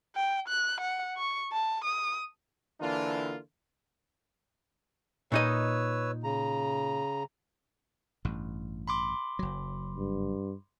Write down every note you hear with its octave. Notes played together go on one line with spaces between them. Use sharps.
G5
F#6
F#5
C#6
A5
D#6
D3 E3 A#3 D4 F4
A#2 D#4 B4 C#5 D#5 E6
C#3 A#5
A1 G2
B5 C6 D6
F#1 F#3
G2